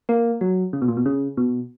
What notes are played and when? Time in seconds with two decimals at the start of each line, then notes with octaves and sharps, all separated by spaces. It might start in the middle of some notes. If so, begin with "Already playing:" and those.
0.09 A#3
0.41 F#3
0.73 C#3
0.82 B2
0.88 A#2
0.97 B2
1.06 C#3
1.37 B2